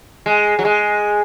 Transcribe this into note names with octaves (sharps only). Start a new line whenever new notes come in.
G#3
F#3
G#3